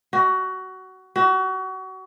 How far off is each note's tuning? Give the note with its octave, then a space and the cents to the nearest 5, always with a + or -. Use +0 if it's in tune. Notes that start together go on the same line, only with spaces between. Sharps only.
F#4 +20
F#4 +30